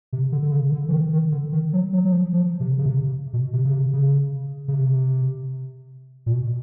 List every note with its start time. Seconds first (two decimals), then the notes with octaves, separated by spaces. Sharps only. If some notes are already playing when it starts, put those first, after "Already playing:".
0.13 C3
0.32 D3
0.43 D3
0.52 C#3
0.72 D3
0.89 E3
0.92 D#3
1.13 D#3
1.32 D3
1.52 D#3
1.73 F#3
1.93 F#3
2.05 F#3
2.12 F3
2.33 F3
2.60 C3
2.78 C#3
2.85 C3
3.33 B2
3.53 C3
3.64 C#3
3.73 C3
3.93 C#3
4.68 C#3
4.74 C3
6.26 A#2
6.33 B2